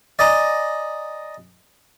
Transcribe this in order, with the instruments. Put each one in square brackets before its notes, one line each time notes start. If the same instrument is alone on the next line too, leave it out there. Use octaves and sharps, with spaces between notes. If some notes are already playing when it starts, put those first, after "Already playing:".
[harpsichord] D5 D#5 G#5 A#5